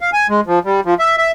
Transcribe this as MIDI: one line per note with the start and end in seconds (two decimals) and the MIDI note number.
0.01 0.10 77
0.13 0.27 80
0.29 0.41 56
0.47 0.59 53
0.65 0.81 55
0.85 0.94 53
0.99 1.16 76
1.17 1.31 76